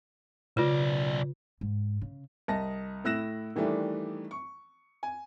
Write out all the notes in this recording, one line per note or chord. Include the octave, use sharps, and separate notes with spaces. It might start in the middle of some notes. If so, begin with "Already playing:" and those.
B1 C#3 F4 B4 D5
G#2
C#3
C2 D#5 A5 A#6
A2 E4 E6 F#6 A#6 E7
D#3 E3 G3 A3 D4
C#6
G#5